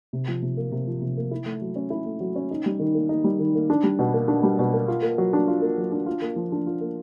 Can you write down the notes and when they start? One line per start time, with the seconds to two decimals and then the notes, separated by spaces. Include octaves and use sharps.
0.13 C3
0.28 F3
0.42 C3
0.57 A#3
0.72 C3
0.88 F3
1.02 C3
1.17 A#3
1.31 E4
1.46 A3
1.62 F#3
1.76 C#4
1.90 E4
2.06 A3
2.20 F#3
2.35 C#4
2.51 D#4
2.66 G3
2.79 D#3
2.95 A#3
3.09 D#4
3.24 G3
3.39 D#3
3.55 A#3
3.70 D4
3.83 G3
3.99 B2
4.14 A#3
4.28 D4
4.43 G3
4.59 B2
4.73 A#3
4.88 F4
5.02 A#3
5.18 F#3
5.33 D4
5.48 F4
5.62 A#3
5.78 F#3
5.92 D4
6.06 F4
6.22 A#3
6.36 F3
6.52 D4
6.67 F4
6.81 A#3